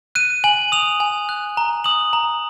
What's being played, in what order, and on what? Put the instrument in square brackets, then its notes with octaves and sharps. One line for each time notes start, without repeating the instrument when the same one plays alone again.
[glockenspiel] F#6 D#7
G#5 F#7
D#6 F7
G#5
F#6
A#5
D#6 F#7
A#5